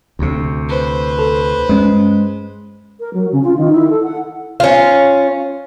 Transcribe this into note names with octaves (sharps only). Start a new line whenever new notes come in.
D2 C3
B4 C5
A4
G2 G#3 C#4
A#4
F#3
C#3
F4
D#3
E4
A4
F#5
C#4 F4